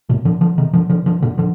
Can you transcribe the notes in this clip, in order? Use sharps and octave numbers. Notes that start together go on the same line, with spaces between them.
A2 C3
D3 F3
D3 F3
C3 D#3
D3 F3
D3 F3
D3 F3
A#2 D3
D3 F3